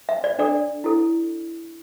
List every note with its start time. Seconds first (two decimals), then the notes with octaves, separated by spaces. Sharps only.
0.09 E5
0.24 D5
0.39 D4 A4 D5
0.84 E4 A4